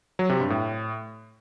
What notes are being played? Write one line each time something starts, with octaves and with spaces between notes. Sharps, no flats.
F#3
C3
G2
A2